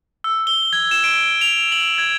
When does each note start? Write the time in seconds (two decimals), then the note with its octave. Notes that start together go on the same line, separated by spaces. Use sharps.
0.24 E6
0.47 G7
0.73 G#6
0.91 E7
1.04 D7
1.41 F7
1.72 F#7
1.98 G#6